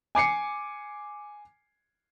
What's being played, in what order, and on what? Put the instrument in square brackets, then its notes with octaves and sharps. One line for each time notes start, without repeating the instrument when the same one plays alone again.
[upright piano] G#5 D6 C7 C#7